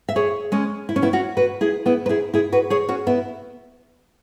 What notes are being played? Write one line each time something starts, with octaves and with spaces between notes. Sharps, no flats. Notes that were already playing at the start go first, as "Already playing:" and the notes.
E5
G#4 C#5
G#3 C#4
E4
C#4
B3 E4
C#4 F#4
F#4 B4
E4 G#4
B3 E4
B4
E4 G#4
E4 G#4
F#4 B4
G#4 C#5
C#4 F#4
B3 E4